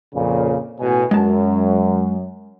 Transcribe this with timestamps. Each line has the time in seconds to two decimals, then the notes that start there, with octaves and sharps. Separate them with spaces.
0.14 F2 A#2 C#3
0.81 A1 B2 G#5
1.11 F#2 G#3 A5